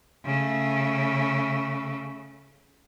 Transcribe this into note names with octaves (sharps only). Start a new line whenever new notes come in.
C#3 A3